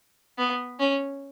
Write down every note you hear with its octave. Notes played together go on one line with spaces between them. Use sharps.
B3
C#4